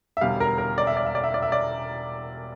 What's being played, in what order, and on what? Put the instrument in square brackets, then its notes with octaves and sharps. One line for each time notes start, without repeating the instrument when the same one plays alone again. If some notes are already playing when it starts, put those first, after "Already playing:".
[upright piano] E5
E1 E2 D3 G3 F5
A#4
A#4
D5
E5
D5
E5
D5
E5
D5
E5
D5